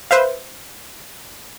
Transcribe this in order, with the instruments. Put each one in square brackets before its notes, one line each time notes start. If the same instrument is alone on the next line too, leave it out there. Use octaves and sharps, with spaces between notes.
[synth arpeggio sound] B4 C5 E5 F5